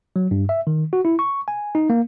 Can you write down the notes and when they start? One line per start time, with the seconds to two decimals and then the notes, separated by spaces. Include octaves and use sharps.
0.16 F#3
0.31 G2
0.49 E5
0.67 D#3
0.93 F#4
1.05 E4
1.19 C#6
1.48 G#5
1.75 D#4
1.90 A#3